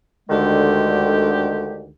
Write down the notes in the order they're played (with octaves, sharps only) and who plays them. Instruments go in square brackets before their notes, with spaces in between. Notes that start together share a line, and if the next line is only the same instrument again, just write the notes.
[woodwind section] D2 D3 D#3 G#3 G4